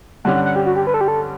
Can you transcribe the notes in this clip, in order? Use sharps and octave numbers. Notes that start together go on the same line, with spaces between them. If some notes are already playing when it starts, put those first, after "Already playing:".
G2 D3 G3 C#4 F#5
F#5
F#5
G4
F#4
G4
B4
A4
G4
A4